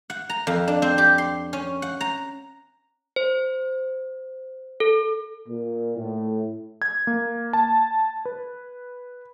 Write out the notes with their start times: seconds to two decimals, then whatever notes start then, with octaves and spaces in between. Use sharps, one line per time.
0.10 F#5
0.30 A#5
0.47 F2
0.68 D4
0.82 C4
0.98 G4
1.18 C6
1.53 C#4
1.82 F#5
2.01 A#5
3.16 C5
4.80 A4
5.48 A#2
5.97 A2
6.82 G#6
7.07 A#3
7.53 A5
8.25 B4